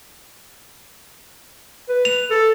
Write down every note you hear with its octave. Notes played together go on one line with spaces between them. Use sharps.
B4
F7
A4